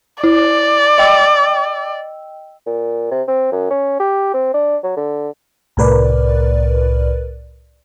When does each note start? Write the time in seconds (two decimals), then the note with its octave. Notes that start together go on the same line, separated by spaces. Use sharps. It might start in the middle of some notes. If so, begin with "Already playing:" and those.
0.24 E4 D5
0.98 D#5 G5 E6
2.67 A#2
3.11 C3
3.28 C4
3.52 F#2
3.70 C#4
4.00 G4
4.34 C4
4.54 D4
4.83 F#3
4.97 D3
5.77 C2 A2 A#4 B4 D5